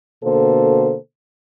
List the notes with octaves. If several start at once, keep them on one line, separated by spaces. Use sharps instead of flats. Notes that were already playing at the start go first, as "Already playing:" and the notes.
B2 D3 A#3 A4 C5